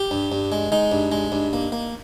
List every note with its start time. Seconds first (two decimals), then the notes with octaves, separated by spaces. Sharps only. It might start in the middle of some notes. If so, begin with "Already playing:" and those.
Already playing: G4
0.11 G2
0.32 G2
0.52 G#3
0.72 G#3 D#4
0.92 G2
1.12 G#3
1.32 G2
1.53 A#3
1.72 A#3